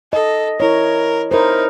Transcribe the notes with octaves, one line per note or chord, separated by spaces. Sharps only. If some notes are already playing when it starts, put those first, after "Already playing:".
A4 D#5
E4 A#4 C#5
D#4 E4 A#4 C5